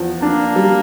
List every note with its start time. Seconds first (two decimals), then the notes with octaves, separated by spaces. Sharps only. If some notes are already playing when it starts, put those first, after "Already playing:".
Already playing: E2 F3
0.22 A#3 D4
0.56 G3